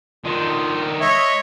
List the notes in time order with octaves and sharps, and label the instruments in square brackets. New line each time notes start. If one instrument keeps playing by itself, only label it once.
[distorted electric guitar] D#3 D4 [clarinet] F4
[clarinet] G#3 [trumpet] C#5 [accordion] D#5 E5